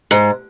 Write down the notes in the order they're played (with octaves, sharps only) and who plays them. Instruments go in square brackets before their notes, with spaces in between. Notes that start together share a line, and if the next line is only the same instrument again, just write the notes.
[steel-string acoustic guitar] G#2